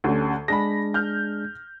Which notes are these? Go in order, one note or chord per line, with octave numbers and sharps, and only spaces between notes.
D2 D3 C#4 G4
G#3 D4 G#4 B5 A#6
F6 G6